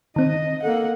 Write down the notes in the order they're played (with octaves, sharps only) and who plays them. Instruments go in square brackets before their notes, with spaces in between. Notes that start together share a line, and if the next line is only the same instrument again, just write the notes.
[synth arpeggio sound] D#3 C4 [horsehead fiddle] D#5
[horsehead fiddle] A#3 F#5 [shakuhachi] A4